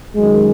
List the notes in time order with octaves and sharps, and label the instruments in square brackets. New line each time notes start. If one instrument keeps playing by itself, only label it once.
[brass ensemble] F#2 D#3 G#3